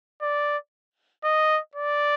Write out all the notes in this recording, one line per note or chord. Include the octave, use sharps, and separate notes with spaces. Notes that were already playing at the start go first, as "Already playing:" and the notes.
D5
D#5
D5